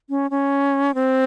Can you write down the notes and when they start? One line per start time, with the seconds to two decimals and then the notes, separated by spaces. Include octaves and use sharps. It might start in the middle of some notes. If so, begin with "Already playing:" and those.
0.10 C#4
0.31 C#4
0.94 C4